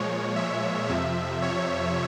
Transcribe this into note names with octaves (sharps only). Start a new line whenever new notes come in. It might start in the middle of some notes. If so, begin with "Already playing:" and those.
Already playing: A#2 F3 G#3 C#5
E5
F2 C3 F3 E5
C#5